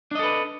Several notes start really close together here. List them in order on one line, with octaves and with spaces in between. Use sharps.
D4 D#5 A4 B4